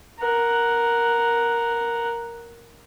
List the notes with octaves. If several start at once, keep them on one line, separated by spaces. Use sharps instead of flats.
A#4 F#5